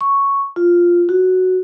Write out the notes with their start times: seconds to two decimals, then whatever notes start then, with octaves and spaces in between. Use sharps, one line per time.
0.01 C#6
0.56 F4
1.09 F#4